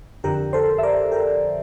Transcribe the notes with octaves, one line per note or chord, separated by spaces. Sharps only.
F2 D3 F3 G4 A#4
A4 C5
E5
A#4 D5
G4 A#4